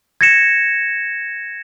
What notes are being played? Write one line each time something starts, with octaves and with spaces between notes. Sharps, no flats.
G#6 A#6 C#7 E7